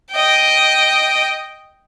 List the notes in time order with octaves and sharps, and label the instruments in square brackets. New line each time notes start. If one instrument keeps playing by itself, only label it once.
[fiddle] D#5 G5